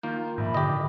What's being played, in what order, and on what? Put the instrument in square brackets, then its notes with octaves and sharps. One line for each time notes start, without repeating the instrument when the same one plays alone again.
[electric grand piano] D#3 F4 [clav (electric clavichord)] A#3 [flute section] G6
[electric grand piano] A#1 D#3 [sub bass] G#2 [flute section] E5 B5
[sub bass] D3 [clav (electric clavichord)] G4 D#5